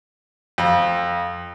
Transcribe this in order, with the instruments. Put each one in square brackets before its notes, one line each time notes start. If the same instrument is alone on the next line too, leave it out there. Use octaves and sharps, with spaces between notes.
[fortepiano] F2